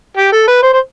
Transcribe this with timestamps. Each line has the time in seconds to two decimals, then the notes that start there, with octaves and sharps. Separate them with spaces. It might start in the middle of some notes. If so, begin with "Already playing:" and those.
0.17 G4
0.32 A4
0.48 B4
0.63 C5
0.74 C5